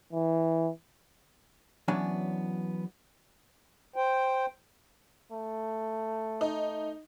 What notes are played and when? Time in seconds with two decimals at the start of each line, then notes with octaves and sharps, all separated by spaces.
0.13 E3
1.88 E3 F#3 B3 C#4 D4
3.96 C5 G5
5.32 A3
6.41 D#4